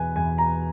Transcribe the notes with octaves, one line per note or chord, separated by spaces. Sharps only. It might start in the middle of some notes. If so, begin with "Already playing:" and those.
Already playing: E2 B2 B4 G#5
E2 G#5
A#5